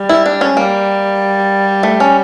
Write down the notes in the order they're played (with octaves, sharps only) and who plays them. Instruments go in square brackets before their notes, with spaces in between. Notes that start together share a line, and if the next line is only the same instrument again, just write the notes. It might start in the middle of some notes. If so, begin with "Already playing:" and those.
Already playing: [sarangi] G3
[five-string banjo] E4
D4
C#4
[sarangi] G3 [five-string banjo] A#3
[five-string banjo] A3
C#4